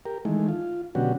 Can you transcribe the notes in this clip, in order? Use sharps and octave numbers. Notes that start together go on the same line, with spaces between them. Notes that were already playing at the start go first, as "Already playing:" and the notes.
G4 A#4
D#3 E3 G#3 A3
F4
B2 D3 F#3 C#4 F#4 G4